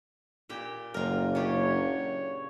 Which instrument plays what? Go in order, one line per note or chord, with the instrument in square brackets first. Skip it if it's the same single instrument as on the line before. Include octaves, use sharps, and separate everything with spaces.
[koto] A#2 G4 G5
[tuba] F#1 [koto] F4 A#4
[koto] C#3 D4 G4 [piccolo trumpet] C#5